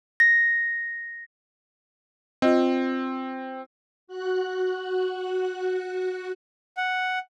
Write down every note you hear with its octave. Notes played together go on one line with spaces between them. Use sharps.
A#6
C4 F4 D#5
F#4 F#6
F#5